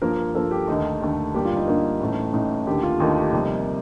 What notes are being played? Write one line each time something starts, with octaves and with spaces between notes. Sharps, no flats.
G2 F3 A#3 A#4
G2 F3 A#3 A4
G4
D#2 D3 A3 D#4
D#2 D3 A3
G2 D3 G3 A#3 G4
F4
D#4
G2 D3 G3 A#3 D#4
A1 A2 A3
A1 A2 A3 D#4
D#2 D3 A3 G4
F4
D#2 D3 A3 D#4
G4
F2 C3 G3 A#3 D#4